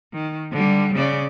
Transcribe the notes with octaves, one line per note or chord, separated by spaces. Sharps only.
D#3
D3 G3
C#3 D5